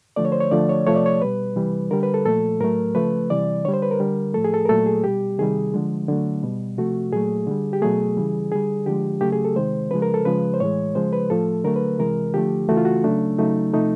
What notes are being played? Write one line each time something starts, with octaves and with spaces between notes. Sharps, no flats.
D3 F3 A3 D5
C#5
C5
C#5
D3 F3 A3 D5
C#5
C3 F3 A3 C#5
D5
C#5
B2 G3 B4
C3 E3 G3
D3 G3 A#4
B4
A4
A#2 F3 A3 A4
A2 F#3 A3 A#4
C#3 F3 A3 B4
C3 E3 G3 D5
D3 G3 C#5
C5
B4
A#4
D3 G3
A2 F3 A3 A4
G#4
A4
A#4
A#2 F#3 A3 A4
G#4
B2 G3 G4
C3 D#3 G3 G#4
D3 F3 G#3
D3 F#3 A3
B2 G3
C3 F3 A3 F#4
A#2 F#3 A3 G#4
D3 G3
G4
B2 F#3 A3 G#4
C#3 E3 G3
D3 G3 G#4
D3 F3 G#3 G4
C#3 F#3 A3 G4
G#4
A4
C3 D#3 G#3 C5
C#3 F3 G#3 B4
A#4
A4
C#3 F3 G#3 B4
C5
A2 E3 G#3 C#5
C#3 F3 G#3 C5
B4
A2 F3 A3 A4
D3 F#3 A3 A#4
B4
C3 E3 G#3 A#4
D3 F3 A3 G4
C#3 E3 A3 F#4
F4
F#4
C#3 F#3 A3 D4
C#3 F#3 A3 D#4
C3 F3 A3 D#4